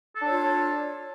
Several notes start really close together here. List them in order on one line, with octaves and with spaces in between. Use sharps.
A4 D4 C#5 F4